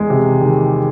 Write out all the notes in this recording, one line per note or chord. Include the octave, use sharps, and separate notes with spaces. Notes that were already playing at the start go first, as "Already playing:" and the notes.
Already playing: E2 D#3 G#3
C3
D#3